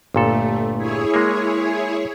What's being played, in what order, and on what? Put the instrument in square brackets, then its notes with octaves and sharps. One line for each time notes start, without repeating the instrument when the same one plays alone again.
[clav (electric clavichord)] G1 A#2 A4 [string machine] A3
[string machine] E4 G#4 C#5
[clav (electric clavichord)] G#3 A#3